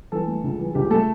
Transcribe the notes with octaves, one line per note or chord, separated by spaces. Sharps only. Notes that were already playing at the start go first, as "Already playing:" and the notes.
E3 A4
A3
C#2
E3
C#2 G4
A3 A4